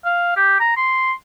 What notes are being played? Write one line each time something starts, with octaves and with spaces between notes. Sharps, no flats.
F5
G4
A#5
C6